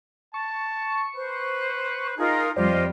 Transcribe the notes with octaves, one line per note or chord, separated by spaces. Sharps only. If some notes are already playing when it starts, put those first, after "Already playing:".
A5 C#6
B4 C5
D#4 F4 G#4 A#4
F2 G3 F4 G4 C5 D5 D#5